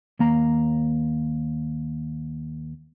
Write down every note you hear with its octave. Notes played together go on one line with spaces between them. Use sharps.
D#2 A#3 A#5